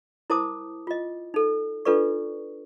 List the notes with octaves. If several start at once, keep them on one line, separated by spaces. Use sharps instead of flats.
E4 A#4 C5 A5 D6 D#6
F4 D#5
D#4 A4
D4 F4 A4 B4 D5 C#6